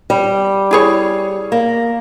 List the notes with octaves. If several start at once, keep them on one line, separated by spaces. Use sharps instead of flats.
G3
E4 G#4 C#5
A#3